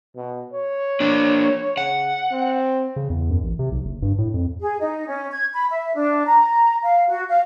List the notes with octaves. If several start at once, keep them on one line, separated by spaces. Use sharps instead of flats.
B2
C#5
A#3 D4
C#3 F#5
C4
C#3
E2
F#2
A1
C3
B1
F#1
G2
A2
F2
G#4
D#4
C#4
G#6
B5
E5
D4
A#5
F5
F#4
F5